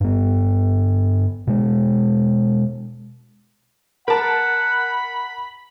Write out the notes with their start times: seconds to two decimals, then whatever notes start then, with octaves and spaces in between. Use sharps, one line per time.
0.01 G2 B3
1.47 B2 G#3
4.08 A#4 F#5 A5 B5